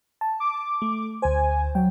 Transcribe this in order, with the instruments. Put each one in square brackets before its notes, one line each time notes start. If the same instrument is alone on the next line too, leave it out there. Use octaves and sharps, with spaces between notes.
[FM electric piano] A5
[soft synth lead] D6
[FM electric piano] A3
[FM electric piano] D2 C5 [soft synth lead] G#5
[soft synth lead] F#3 [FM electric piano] G5